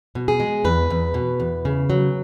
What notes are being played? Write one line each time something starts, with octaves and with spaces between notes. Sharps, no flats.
B2
G#4
G#3
E2 B4
E2
B2
E2
C#3
F#3